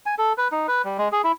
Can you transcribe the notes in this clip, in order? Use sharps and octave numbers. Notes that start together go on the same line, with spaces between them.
G#5
A4
B4
D#4
B4
G3
G#3
G#4
E4